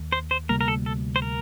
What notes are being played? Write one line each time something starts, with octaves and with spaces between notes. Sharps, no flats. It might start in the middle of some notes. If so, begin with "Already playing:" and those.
Already playing: D#2 D#3
C5
C5
D2 C3 G3 A#3 A#4
A#4
A4
A4
C5
A#4